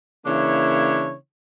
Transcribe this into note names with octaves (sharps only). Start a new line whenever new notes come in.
C#3 E3 A#3 D4 E4 C#5